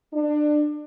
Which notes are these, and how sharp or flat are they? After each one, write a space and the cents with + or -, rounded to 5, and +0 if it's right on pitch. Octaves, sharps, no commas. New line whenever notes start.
D4 +25